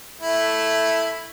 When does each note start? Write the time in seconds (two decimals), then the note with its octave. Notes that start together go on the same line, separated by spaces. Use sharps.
0.22 A3 E4